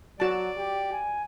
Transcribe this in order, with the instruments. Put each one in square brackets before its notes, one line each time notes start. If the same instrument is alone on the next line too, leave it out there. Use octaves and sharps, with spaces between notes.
[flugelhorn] F#3 [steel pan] F#4 A5 [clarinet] D5
[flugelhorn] G4
G#5